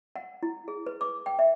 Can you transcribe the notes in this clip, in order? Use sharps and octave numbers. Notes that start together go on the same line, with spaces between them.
F#5
E4
G#4
B4
D6
G5
E5